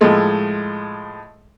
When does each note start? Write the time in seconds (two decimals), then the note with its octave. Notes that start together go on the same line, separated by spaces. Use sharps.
0.01 A2 F3 G#3 A3